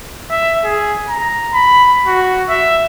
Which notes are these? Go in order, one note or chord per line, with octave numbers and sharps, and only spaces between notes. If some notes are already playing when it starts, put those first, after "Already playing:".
E5
G#4
A#5
B5
F#4
E5